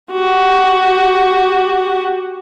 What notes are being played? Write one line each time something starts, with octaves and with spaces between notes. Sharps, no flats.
F#4 G4